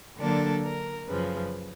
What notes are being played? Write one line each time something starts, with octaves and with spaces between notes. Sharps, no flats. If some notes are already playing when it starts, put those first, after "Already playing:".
D3 F#3 A#3 D4 A4
A#4
F#2 C#3 F3 B4